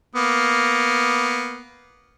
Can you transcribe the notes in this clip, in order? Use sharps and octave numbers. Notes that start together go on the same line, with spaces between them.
A#3 B3